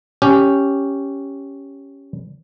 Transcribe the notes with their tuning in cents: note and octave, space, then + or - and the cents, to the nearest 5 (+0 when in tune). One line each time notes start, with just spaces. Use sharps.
C#4 +0 G4 +0